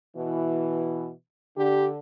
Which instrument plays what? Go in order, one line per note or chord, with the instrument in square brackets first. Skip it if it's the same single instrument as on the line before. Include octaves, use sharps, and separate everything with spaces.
[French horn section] B2 E3
[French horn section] D3 [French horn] G4